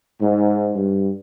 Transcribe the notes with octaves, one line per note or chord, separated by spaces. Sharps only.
G#2
G2